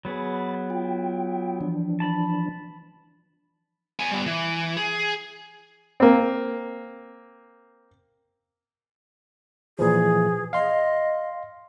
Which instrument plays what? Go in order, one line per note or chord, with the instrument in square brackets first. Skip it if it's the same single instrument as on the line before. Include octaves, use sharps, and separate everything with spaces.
[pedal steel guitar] F#3 B3 G#4 [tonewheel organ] B5 A6
[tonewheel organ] F4 G5
E3 F3 D4
[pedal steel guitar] A5 B5
[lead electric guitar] B3 G#5
G3 B3
E3
G#4
[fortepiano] A#3 C4
[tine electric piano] A#2 E3 F3 [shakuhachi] G#4
[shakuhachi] D#5 [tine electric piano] F5 C6